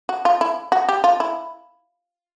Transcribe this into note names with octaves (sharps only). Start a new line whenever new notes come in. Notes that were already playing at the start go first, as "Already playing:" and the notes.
F#4
F4
E4
F#4
G4
F4
E4